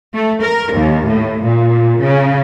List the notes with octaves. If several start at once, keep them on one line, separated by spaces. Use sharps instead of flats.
A3
A#4
D#2
A2
A#2
C#3